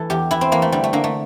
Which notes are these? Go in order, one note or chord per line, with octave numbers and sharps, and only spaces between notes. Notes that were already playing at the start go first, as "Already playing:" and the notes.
Already playing: E3 A4
E2 G4
E3 E4
C4
E3 A#3
A3
D3 G3
A3
D3 A#3
A3